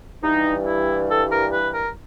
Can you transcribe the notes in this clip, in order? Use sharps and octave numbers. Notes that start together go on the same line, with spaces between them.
G2 E3 G3 D#4
E4
A4
A#4
B4
A#4